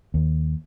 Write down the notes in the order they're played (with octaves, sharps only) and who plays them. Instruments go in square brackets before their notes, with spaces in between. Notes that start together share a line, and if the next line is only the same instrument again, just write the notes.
[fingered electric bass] D#2